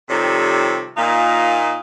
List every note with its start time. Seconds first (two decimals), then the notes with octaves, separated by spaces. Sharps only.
0.09 C3 D#3 F3 G3 A4 C#5
0.96 A#2 D#4 F5